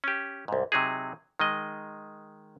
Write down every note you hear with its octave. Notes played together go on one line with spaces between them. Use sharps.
C#4 G4
C2 G#2
C3 F#3 D#4 G#4
D#3 G#3 D#5